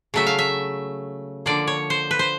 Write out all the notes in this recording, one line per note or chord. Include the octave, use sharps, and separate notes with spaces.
C#3 F#3 A3 E5
F5
E5
D3 F3 A#3 D5
C#5
C5
B4
C5